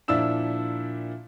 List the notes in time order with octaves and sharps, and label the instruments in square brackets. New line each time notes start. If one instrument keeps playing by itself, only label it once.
[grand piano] A#2 F3 D4 E4 E6 E7